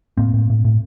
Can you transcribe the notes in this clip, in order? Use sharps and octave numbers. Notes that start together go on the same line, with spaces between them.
A2 A#3 C4
A2
A2
A2